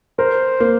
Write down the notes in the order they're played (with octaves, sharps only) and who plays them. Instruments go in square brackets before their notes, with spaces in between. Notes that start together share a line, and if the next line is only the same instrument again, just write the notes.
[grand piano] A#4 [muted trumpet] C5
[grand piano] A#3